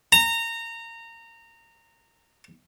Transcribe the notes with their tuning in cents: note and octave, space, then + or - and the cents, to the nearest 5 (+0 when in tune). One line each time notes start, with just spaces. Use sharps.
A#5 -20